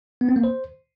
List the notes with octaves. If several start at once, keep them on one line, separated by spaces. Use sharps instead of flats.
B3
C4
A#3
C5